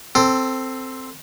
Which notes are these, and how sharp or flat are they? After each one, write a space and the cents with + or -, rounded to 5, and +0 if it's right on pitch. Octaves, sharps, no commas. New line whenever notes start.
C4 +0 A4 +10